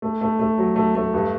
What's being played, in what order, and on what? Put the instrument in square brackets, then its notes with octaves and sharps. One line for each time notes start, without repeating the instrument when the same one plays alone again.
[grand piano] A3
A3
A3
F#3
A3
A3
G2